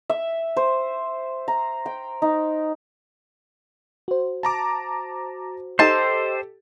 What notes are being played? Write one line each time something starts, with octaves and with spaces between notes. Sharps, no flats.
E5
C5
A#5
G5
D#4
F#4 C5
A5 A#5 D6
D#4 G4 A4 C5 A5